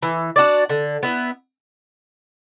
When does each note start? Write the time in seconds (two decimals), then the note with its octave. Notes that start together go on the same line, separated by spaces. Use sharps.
0.03 E3
0.36 D4 F#4 D5
0.69 D3
1.03 B3 E4